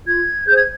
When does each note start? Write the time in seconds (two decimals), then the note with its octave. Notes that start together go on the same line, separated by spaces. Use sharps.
0.07 F4 G#6
0.47 G#4 G6
0.50 C5 G#6